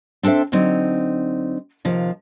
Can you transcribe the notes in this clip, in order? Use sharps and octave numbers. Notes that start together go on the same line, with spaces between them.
C4 D4 A4 C5 E5
D3 F#3 C4 D#4
D#2 C3 F3